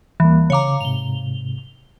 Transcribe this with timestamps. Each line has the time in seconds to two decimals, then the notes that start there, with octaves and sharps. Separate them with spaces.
0.20 D#2 E3 G3 A#3
0.50 C#3 C#5 F5 A#5 D6
0.81 G#2 C3 F7 G7